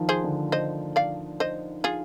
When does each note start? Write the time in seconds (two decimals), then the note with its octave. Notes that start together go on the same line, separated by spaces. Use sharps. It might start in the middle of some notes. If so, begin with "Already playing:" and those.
Already playing: D#3 F3
0.09 G#4 C5
0.24 D3
0.52 C5 D#5
0.96 D5 F5
1.40 C5 D#5
1.84 F4 G#4